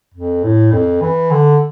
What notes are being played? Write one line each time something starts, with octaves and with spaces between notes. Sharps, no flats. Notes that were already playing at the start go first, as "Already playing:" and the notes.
F2
A2
F2
E3
D3